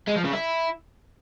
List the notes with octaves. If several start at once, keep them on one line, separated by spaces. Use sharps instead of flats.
G#3
F3
C#3
E4